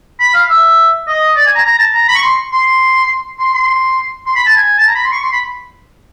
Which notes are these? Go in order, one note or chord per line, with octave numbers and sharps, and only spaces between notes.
B5
F5
E5
D#5
D5
G#5
A#5
A#5
A5
A#5
B5
C#6
C6
C6
C6
C6
C6
B5
A5
G#5
A5
A#5
B5
C6
C#6
C6
B5